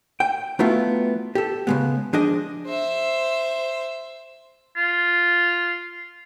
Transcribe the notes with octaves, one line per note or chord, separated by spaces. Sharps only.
G5
F#3 A3 B3 E4 F4
G4 A4
C#3 G#3 B3
F3 D4 G#4 D#5
C5 E5
F4